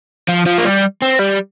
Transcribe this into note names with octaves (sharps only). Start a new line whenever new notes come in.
F3
F3
A#3
G3
C4
G3